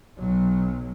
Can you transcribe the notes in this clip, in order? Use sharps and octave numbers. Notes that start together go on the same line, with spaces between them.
B1 F#3